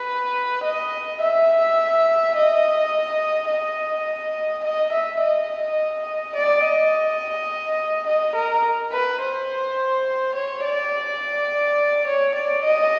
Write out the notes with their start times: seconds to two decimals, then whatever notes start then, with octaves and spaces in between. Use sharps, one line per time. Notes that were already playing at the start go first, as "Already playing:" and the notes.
Already playing: B4
0.63 D#5
1.21 E5
2.36 D#5
3.49 D#5
4.64 D#5
4.92 E5
5.21 D#5
6.35 D5
6.64 D#5
8.06 D#5
8.35 A#4
8.92 B4
9.21 C5
10.35 C#5
10.64 D5
12.07 C#5
12.35 D5
12.64 D#5